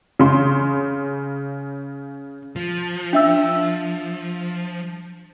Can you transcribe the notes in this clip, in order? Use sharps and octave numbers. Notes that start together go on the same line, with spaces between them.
C#3 C6
F3
D4 E5 E6